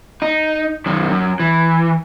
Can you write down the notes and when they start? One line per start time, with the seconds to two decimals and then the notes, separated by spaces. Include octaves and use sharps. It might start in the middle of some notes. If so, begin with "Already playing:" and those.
0.22 D#4
0.86 F#2 D#3
1.10 F#2
1.40 E3